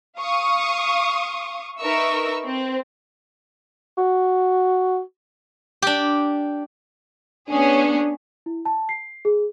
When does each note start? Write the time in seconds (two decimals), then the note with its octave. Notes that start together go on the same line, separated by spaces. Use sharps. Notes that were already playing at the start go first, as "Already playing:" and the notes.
0.19 F5 C#6 D#6
1.79 D#4 A#4 B4 E5 C#6 E6
2.46 C4
3.98 F#4
5.82 D4 G4
7.49 B3 C#4 D4 G#4
8.46 E4
8.65 A5
8.89 C7
9.25 G#4